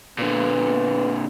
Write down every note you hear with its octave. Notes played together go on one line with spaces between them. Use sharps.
A#2 D3 B3